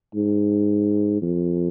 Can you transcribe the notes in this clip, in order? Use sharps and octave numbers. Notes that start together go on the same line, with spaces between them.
G#2
F2